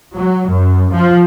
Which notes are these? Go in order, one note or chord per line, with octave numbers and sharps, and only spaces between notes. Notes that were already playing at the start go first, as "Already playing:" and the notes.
F#3
F#2
F3